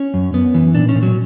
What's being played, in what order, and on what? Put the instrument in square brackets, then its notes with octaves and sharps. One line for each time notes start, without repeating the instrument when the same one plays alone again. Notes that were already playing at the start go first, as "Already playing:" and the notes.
Already playing: [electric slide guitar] C#4
F#2
F#2 B3
E3
A#2 D4
C#4
A#2
F#3